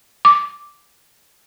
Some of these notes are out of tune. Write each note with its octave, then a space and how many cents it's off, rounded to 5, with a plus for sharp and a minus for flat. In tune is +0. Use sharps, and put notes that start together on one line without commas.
D6 -5